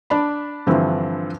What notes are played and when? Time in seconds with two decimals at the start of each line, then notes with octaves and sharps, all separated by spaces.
0.10 D4 D5 A5 B5
0.67 G2 D3 E3 F3 C4 E4